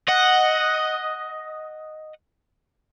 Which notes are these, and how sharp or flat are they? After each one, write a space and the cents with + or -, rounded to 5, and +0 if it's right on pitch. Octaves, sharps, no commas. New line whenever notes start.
D#5 +0 F#5 +0